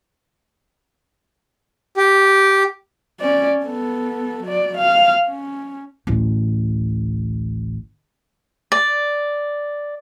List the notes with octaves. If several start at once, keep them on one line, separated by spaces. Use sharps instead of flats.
G4
C#4 D5
B3 A4
F#3 D5
F5
C#4
A1 D2
D5